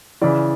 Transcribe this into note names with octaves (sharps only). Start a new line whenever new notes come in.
C#3 E3 D5